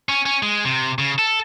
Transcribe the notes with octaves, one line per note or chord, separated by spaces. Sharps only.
C#4
C#4
G#3
C3
C#3
A4